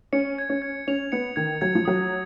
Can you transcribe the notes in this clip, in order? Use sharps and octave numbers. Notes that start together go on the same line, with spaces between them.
C#4 C#7
G#6
C#4
G#6
C#4 F7
B3 C#7
D#3 G#6
F#3 G#6
F3
F#3 D#6